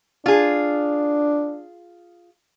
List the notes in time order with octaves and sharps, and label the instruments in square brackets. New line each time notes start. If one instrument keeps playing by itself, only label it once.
[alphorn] D4 [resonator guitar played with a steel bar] F4 G#4